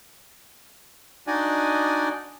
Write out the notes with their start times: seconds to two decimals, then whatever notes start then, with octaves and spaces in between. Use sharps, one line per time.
1.27 D4 D#4 F#4 D5 D#5 G#5